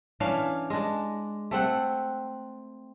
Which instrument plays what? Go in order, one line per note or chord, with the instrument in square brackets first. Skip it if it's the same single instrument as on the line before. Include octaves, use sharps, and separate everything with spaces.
[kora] E3 C#4 D4 F5
G#3 D4
A3 C4 F#5